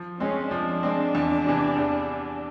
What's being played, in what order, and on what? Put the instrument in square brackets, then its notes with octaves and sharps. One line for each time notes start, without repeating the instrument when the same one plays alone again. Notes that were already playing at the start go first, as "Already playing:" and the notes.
Already playing: [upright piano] F3
[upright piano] G#3 C4 [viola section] C#4
[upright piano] F3 [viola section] D4
[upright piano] G#3 C4
E2
C3 E3
E2